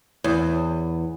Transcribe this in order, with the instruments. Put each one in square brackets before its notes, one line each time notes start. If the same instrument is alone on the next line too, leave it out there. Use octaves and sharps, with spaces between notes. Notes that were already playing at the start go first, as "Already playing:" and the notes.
[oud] E2